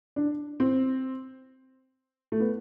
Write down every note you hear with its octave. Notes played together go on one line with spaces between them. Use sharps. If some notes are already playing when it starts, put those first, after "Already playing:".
D4
C4
A3
B3